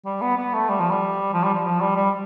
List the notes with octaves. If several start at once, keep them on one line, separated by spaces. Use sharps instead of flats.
G3
B3
B3
A3
G3
F3
G3
F3
G3
F3
F3
G3
G3